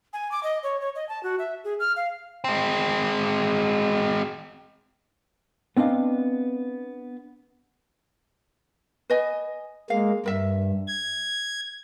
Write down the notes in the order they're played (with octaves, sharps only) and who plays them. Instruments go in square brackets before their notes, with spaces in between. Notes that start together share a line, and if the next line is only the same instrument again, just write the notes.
[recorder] G#5
D6
D#5
C#5
C#5
D#5
A5
F#4
E5
G#4
F6
F5
[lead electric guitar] G#3 C4
[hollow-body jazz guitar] B3 C4 D4 D#5 F5
[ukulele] B4 D#5 G#5
[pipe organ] G#3 A#3 [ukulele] F5
[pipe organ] G2 [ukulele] A#4 E5
[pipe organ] G#6